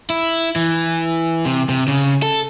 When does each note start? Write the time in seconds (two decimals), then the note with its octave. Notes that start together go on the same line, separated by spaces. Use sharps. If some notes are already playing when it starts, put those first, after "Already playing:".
0.10 E4
0.56 E3
1.45 C3
1.69 C3
1.88 C#3
2.22 A4